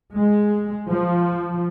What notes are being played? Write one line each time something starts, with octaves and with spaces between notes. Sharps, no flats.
G#3
F3